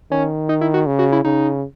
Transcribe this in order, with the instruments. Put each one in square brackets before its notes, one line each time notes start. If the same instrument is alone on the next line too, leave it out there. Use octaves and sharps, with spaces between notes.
[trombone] D#3 [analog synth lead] C#4
[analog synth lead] D#4
E4
F#4
[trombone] C#3
[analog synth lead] F#4
E4
[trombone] C#3 [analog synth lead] D#4